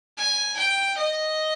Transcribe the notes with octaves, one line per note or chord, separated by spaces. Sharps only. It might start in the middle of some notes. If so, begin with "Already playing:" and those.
G#5
G5
D#5